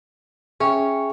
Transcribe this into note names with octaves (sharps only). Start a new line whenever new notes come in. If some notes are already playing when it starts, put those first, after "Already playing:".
C#4 G#4 C#5 E5 G5